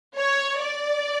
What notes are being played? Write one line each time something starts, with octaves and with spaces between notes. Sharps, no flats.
C#5
D5